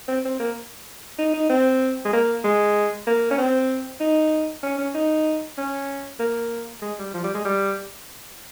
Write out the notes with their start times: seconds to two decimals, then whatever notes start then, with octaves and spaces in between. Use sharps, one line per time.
0.08 C4
0.25 C4
0.40 A#3
1.19 D#4
1.34 D#4
1.49 C4
2.05 G#3
2.13 A#3
2.44 G#3
3.07 A#3
3.31 C#4
3.38 C4
4.00 D#4
4.63 C#4
4.78 C#4
4.95 D#4
5.58 C#4
6.20 A#3
6.82 G#3
6.99 G3
7.14 F3
7.24 G3
7.34 G#3
7.45 G3